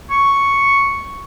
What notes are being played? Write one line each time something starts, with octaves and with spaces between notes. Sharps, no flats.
C#6